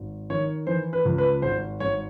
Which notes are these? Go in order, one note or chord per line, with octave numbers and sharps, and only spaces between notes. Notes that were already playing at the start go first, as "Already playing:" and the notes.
Already playing: G#1
D#3 C#5
E3 C5
B4
C#2
B4
G#1 C5
G#1 C#5